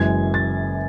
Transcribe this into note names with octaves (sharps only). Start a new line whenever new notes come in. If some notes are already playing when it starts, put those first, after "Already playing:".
Already playing: F#1 F#2 E3 G#3 G#6
A6